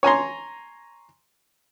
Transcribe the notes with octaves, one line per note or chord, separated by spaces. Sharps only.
C#5 G#5 A#5 C6